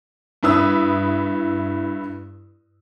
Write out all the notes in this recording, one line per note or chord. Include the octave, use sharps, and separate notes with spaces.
G2 E4 B4 D#6 E6